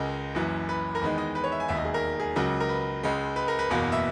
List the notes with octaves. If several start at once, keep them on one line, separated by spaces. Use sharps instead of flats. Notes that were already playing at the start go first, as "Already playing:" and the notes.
Already playing: C#2 C#3 G#3 A#4
F#1 F#2 E3
B4
A#4
E2 D#3 G#3 B4
D#5
B4
C#5
E5
G#5
E1 D#2 D#3 E5
D#5
G#4
A#4
G#4
C#2 C#3 F#3 A#4
A#4
B4
C#2 C#3 G#3
B4
A#4
B4
F#1 E2 B2 A#3
E5